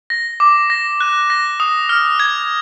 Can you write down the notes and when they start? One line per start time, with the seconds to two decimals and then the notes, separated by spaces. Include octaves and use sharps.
0.10 A#6
0.40 D6
0.70 A#6
1.01 F#6
1.30 A#6
1.60 D#6
1.89 F6
2.20 G#6